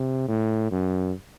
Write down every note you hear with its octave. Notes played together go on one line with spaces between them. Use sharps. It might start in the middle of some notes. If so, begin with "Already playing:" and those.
Already playing: C3
A2
F#2